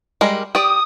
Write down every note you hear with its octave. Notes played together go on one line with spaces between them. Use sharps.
G3 G#3 A#4
G4 D5 D#6